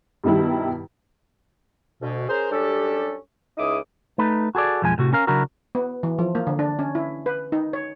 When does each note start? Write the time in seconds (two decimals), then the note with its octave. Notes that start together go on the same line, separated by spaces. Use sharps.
0.24 G2 B2 D#3 G3 E4
2.02 D2 B2
2.29 C#4 G#4 A#4 C5
2.51 F#2 G3 C#4 D4 G4 A4
3.58 C#2 D#4 E4 G#4 D6 D#6
4.18 A3 D#4 B4
4.55 F#4 G#4 A4 D5
4.82 B1 F2 F3 G#3 F#5 G#5
4.98 A2 C3 F#4
5.13 C#4 A#4 F5
5.27 C#3 F#3 D4 E4 F#4 A#4
5.75 B3
6.03 E3
6.19 F3
6.35 A#3
6.47 D3
6.59 D4
6.79 C#4
6.95 E4
7.26 B4
7.52 D#4
7.73 C#5